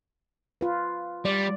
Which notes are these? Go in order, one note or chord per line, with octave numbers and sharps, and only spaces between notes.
F4 B4
G3 D5